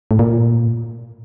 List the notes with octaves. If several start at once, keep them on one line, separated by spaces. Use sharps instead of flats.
A2
A#2